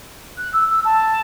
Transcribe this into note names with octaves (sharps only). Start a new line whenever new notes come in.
F#6
E6
E6
A5